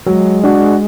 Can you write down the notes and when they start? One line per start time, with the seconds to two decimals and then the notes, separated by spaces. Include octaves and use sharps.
0.06 F#3 G#3
0.44 D4 F#4